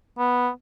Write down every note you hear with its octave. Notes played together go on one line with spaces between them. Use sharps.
B3